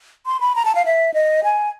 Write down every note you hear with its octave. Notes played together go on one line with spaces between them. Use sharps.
C6
B5
A#5
A5
F5
E5
D#5
G#5